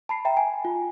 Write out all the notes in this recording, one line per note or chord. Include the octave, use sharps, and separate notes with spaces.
A5 B5 C7
E5 G5 A#5
G#5
F4